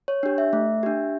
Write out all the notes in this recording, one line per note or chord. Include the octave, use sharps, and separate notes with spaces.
C#5
D4 G4
E5
A3
D4 G4